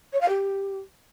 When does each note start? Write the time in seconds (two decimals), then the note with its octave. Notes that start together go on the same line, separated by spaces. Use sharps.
0.12 C#5
0.20 F5
0.28 G4